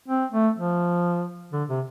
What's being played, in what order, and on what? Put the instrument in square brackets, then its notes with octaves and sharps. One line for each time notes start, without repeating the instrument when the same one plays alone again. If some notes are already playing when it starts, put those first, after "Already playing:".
[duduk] C4
A3
F3
D3
C3